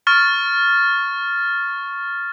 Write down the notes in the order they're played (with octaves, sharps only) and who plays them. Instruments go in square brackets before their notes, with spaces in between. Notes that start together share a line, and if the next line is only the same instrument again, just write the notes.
[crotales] C#6 F6 A6